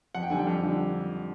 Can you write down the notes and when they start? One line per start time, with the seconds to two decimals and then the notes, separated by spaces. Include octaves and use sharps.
0.15 F2 F#5
0.23 G5
0.30 D3 G3 G#5
0.39 G5
0.47 F2
0.63 D3 G3